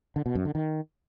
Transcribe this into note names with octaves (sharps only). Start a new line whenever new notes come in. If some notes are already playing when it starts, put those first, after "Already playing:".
D3
B2
F#2
D3
D#3